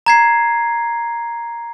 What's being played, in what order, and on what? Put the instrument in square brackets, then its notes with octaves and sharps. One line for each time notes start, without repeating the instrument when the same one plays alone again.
[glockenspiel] A#5 G#6 C7